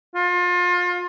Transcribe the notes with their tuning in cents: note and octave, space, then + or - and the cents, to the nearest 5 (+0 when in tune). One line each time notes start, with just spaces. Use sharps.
F4 +30